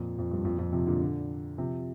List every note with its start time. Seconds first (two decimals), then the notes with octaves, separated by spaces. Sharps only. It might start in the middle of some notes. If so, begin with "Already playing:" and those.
Already playing: F2 A#2
0.18 F2
0.31 G2
0.44 F2 A#2
0.58 F2 A#2
0.72 C3 F3
0.87 A#2 D3
1.01 A#2 D3
1.58 C3 F3